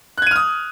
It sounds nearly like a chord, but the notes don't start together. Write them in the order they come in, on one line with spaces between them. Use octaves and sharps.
F#6 G#6 D#7 F6 D#6